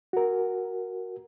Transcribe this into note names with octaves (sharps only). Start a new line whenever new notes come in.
F#4 A#4